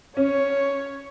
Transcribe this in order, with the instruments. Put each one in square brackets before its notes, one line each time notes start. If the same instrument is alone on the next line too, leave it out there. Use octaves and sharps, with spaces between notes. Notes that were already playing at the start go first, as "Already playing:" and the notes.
[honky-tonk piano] C#4 [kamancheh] C#5